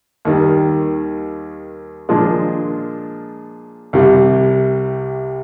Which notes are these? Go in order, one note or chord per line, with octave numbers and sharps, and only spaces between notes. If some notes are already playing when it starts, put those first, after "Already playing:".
D#2 D#3 G3
A#2 F3 G#3 D4
C2 C3 G3